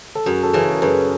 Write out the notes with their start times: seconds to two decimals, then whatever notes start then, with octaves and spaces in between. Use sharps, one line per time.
0.15 A4
0.26 F#2 F#4 G#4
0.43 A4
0.53 C#3 E3 G#4 A#4
0.71 A#4
0.82 F#2 A4 B4